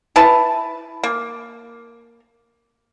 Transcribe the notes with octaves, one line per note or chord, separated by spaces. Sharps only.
E4 B4 A5
A#3